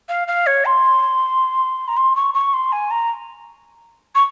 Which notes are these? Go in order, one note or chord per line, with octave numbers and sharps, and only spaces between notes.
F5
F5
C#5
C6
A#5
C6
C#6
C#6
C6
G#5
A#5
C#6